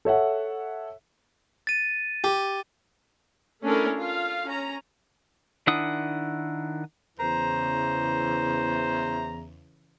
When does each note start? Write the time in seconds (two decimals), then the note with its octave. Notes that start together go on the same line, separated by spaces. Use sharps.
0.05 A4 C#5 E5 F#5
1.67 A6 D#7
2.24 G4
3.63 A3 C#4 D4 E4 A4 A#4
3.97 F4 F5
4.47 C#4 A#5
5.67 D#3 D4 E4 F#5 D#6
7.19 E2 C#3 E3 C5 A#5